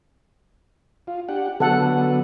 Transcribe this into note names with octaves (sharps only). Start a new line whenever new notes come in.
F4
D4 G4 F#5
D3 F#3 B3 A4 F#5